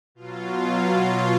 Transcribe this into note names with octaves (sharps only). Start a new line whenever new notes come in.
B2 F#3 F4